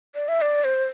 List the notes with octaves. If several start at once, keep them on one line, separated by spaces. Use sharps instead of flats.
D5
E5
D5
C5